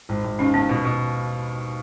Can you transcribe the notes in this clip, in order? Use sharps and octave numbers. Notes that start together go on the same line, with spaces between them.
G#1
G#1
D#2 C#4
D#2 B3
B2
B2